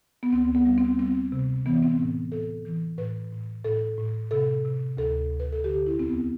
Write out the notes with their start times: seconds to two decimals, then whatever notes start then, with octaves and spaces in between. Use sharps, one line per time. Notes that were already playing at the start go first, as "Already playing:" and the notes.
0.23 B3
0.33 D2 C4
0.55 B3
0.65 G3
0.78 C4
0.99 G3 C4
1.32 C3
1.66 E3 B3
1.83 C4
1.99 A2
2.32 A2 A4
2.65 E3
2.98 A2 B4
3.32 A2
3.65 A2 A4
3.98 A2
4.31 C3 A4
4.65 C3
4.97 D2 A4
5.30 D2
5.40 B4
5.53 A4
5.64 D3 G4
5.86 E4
5.98 E2 C4
6.08 B3